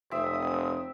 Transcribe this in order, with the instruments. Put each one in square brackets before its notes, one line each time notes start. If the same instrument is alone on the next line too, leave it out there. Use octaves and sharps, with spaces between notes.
[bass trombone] F1 [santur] C4 E5 [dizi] D#6